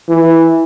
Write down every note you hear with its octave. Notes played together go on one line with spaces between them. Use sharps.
E3